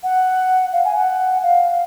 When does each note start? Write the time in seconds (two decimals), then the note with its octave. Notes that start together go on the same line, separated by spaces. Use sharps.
0.03 F#5
0.73 F5
0.85 G#5
0.96 F#5
1.43 F5